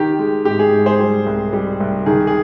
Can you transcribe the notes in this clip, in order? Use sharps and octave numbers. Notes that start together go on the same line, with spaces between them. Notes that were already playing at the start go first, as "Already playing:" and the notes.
Already playing: D#3 G4
G#3
G#2 G4
G#4
G#2
G#4 C5
G3
C2
G3
C2
D#3 G#4
G#4